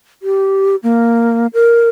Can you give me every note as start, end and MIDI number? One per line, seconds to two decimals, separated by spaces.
0.22 0.76 67
0.83 1.47 58
1.54 1.89 70